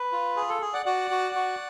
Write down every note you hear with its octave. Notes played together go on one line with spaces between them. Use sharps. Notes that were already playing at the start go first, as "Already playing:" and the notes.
Already playing: B4
F4
G#4
A4
G#4
D5 F#5
F#4 D5 F#5
F#4
F#4